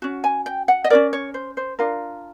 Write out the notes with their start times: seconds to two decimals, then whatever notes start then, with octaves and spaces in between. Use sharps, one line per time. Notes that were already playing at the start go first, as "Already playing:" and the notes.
0.02 C#4 F#4
0.24 G#5
0.46 G5
0.68 F#5
0.84 D#5
0.90 C#4 F4 A#4 D5
1.13 C#5
1.34 C5
1.57 C5
1.79 D4 F4 A#4